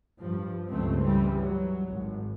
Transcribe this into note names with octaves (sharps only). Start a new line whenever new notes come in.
G2 F3
C#2 G2 F3 A3 C4
E3 G3
F#3
G#1